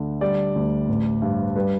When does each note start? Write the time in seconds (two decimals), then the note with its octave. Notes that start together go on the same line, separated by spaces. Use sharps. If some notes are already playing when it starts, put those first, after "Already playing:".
Already playing: D2 D3
0.21 G3 D5
0.56 D2
0.89 A1
1.22 G2
1.55 G3 B4